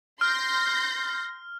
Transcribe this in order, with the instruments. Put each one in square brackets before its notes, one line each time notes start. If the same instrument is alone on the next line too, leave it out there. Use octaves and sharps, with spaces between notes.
[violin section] C6 G6 A#6 [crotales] F6